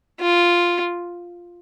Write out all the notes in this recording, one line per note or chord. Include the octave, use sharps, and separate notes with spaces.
F4